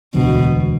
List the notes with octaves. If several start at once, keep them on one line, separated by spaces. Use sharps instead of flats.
E1 D2 B2 D3